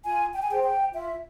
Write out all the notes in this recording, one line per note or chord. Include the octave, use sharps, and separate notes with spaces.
F4 G#5
G5
G#5
G#4 C5 G5
G5
F4 E5